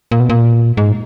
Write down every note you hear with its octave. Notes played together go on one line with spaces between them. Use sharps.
A#2
B2
A#2
G#2